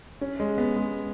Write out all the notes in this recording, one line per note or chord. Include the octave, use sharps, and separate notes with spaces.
C#4
G#3
B3
G#3